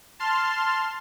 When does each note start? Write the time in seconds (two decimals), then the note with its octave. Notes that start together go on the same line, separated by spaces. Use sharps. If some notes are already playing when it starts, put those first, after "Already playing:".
0.19 A5 C6 F6